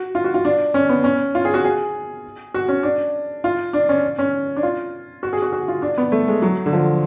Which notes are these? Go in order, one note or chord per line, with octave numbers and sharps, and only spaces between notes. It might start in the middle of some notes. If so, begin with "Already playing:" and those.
Already playing: F#4
F4
F#4
F4
D4
C#4
B3
C#4
F4
G#4
F#4
G#4
F#4
C#4
D4
F4
D4
C#4
C#4
D4
F4
F#4
G#4
F#4
F#4
F4
D4
B3
A3
G#3
F#3
D3
F3